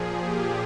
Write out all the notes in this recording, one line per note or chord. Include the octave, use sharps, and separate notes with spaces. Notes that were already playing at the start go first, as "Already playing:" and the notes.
Already playing: A#2 F3 G#4
G4